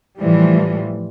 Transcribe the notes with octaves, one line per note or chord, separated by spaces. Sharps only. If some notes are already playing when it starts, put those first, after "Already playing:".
A2 E3 F3 G3